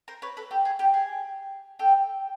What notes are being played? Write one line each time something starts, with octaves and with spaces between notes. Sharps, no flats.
A#4 C5
B4 C#5
A4 B4
G4 A4
G#4
G4
G#4
G4 A4